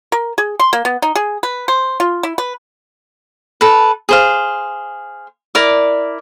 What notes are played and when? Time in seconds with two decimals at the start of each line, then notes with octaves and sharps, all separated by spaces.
0.12 A#4
0.38 G#4
0.59 C6
0.73 A#3
0.85 B3
1.02 D#4
1.15 G#4
1.43 B4
1.68 C5
2.00 F4
2.23 E4
2.38 B4
3.61 A4 B4
4.09 G#4 C5 F5
5.55 E4 A#4 D5 D6